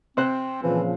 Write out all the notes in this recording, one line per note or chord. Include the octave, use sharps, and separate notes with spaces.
C3 C4 C5 F#6
A#2 C#3 E3 F3